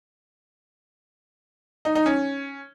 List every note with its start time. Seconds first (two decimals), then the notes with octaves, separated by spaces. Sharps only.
1.85 D#4
1.95 D#4
2.06 C#4